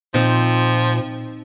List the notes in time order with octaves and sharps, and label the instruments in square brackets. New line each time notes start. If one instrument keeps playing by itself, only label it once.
[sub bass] A#2 [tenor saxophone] F3 [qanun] C4 D#4